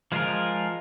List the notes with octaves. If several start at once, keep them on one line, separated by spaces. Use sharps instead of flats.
F3 G#3 F4 A#4